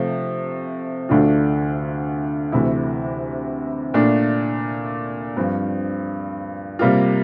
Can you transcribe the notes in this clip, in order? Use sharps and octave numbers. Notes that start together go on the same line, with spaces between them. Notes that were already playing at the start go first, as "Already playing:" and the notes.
Already playing: C3 F3 A3
D2 D3 A3 D4 F4
D2 C3 E3 A3 E4
A#2 A3 D4 F4
G2 F3 C4 F4
C3 G3 A#3 F4